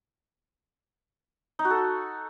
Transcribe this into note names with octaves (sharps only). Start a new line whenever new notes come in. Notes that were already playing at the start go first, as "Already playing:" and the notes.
D#4
F#4
A4